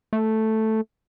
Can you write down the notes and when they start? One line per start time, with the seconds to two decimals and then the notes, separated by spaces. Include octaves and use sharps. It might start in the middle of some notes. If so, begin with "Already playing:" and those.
0.13 A3